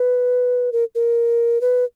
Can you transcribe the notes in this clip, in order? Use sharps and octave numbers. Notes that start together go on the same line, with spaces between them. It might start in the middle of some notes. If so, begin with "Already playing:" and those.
Already playing: B4
A#4
A#4
B4